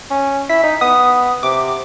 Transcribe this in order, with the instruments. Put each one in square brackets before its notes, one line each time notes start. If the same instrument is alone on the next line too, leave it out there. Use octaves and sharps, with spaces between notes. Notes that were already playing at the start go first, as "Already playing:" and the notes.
[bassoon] C#4
[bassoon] E4 [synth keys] B6
[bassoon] D#4
[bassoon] B3 [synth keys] D#6
[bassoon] C3 [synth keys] D6